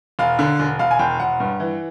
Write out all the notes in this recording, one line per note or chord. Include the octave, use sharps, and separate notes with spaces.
E1 F5
D3
E1
E1 F5
G#5
E1 G5
E1 F#5
G2
E3